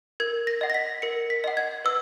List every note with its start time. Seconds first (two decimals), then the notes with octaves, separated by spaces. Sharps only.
0.20 A#4 G#6
0.47 A#6
0.61 D#5 F#5
0.70 A#6
0.74 B6
1.02 A#4 C#7
1.30 B6
1.44 D#5 F#5
1.57 G#6
1.85 B4 E6